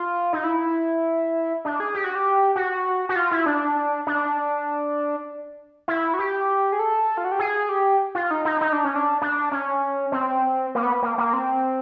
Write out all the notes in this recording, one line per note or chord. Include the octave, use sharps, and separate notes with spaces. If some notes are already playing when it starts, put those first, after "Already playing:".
Already playing: F4
D#4
E4
D4
G#4
G4
F#4
G4
F#4
F#4
F4
E4
D4
D4
E4
F#4
G4
G#4
A4
F4
F#4
G4
G#4
G4
F4
D#4
D#4
D#4
D4
C#4
D4
D4
C#4
C4
A#3
B3
A#3
A#3
C4